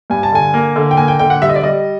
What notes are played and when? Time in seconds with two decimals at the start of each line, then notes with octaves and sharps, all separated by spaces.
0.10 G2 G#5
0.23 A5
0.32 D3 G#5
0.54 A#3
0.76 D3
0.91 G5
0.97 A#3 G#5
1.08 G5
1.19 D3 G5
1.30 F#5
1.42 G3 E5
1.49 D#5
1.56 D5
1.63 G3 D#5